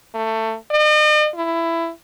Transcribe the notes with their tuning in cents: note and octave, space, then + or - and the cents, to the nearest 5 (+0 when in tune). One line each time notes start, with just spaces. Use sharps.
A3 +20
D#5 -45
E4 +15